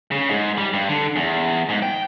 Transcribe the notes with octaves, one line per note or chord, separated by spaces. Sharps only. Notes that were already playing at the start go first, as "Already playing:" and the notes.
C#3
G#2
G3
G2
D3
E2
G#2
G5